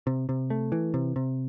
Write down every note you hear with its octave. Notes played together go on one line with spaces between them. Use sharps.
C3
C3
A3
E3
C3
C3